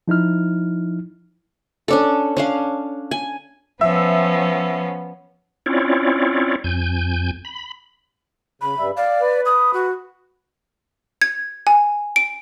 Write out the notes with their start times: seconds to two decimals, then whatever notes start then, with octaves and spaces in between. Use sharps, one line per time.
0.08 F3 D#4 E4 F6
1.88 C#4 D4 A4
2.37 C#4 D4 F5
3.11 G#5
3.81 F3 B3 C#4 E5
5.66 C4 C#4 E4 F4 C#5 D5
6.64 F2 G#5 G6
7.45 B5
8.62 C#3 B5
8.79 G2 G3 E5
8.97 D5 F5
9.21 B4
9.46 D#6
9.74 F#4
11.22 G#6
11.67 G#5
12.16 D7